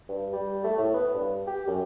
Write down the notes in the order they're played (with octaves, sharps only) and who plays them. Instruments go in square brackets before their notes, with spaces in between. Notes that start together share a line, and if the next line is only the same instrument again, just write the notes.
[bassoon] G2
G3
A3
A2
B3
G2
G4
F#2